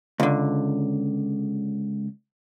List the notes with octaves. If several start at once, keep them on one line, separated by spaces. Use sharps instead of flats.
C#2 D3